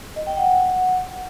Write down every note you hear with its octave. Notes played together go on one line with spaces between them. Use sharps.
D#5
G5
F#5